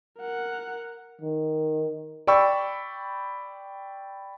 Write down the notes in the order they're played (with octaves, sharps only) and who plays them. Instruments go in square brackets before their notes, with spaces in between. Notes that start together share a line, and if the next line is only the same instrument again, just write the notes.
[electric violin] A#4 F#5
[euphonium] D#3
[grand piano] D5 G5 B5 C#6 E6